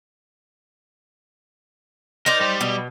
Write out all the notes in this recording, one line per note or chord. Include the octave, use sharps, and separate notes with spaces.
D#4 A#4 C5 D5
G3
B2